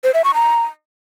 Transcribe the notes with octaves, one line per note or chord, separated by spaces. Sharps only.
C5
E5
C#6
A#5